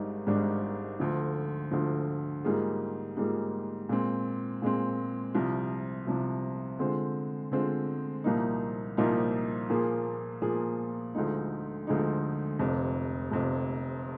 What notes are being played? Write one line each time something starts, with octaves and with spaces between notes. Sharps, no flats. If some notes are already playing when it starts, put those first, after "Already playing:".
Already playing: G#1 G#2 D#3 G3 D4
G#1 G#2 D#3 G3 D4
D2 D3 F3
D2 D3 F3
G#2 G3 A#3 F4 G#4
G#2 G3 A#3 F4 G#4
A#2 G#3 C4
A#2 G#3 C4
C2 C3 F3
C2 C3 F3
D3 G#3 C4 F4 C5
D3 G#3 C4 F4 C5
C2 A#2 F3 A#3 D#4
C2 A#2 F3 A#3 D#4
A#2 F3 A#3 F4 G#4
A#2 F3 A#3 F4 G#4
D2 D3 F3 G#3 D#4
D2 D3 F3 G#3 D#4
F1 F2 C3
F1 F2 C3